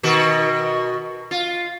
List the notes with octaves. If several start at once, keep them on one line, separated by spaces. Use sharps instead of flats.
B2 D#3 F#4
F4